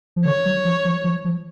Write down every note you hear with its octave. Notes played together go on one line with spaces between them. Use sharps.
F3
D3 C#5
F#3
F3
F3
F3
F3